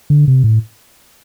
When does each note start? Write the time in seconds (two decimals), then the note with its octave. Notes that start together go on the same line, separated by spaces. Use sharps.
0.10 D3
0.28 C3
0.44 A2